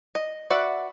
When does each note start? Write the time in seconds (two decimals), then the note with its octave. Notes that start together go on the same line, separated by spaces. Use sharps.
0.15 D#5
0.50 F#4 B4 D5 E5 F#5